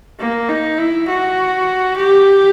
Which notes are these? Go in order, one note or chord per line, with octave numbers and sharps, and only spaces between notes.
A#3
D#4
E4
F#4
G4